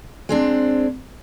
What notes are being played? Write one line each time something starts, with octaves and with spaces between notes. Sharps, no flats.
G#3 C4 D4